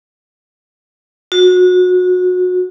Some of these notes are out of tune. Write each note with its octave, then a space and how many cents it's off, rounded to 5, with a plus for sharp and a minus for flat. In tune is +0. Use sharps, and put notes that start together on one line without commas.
F#4 -25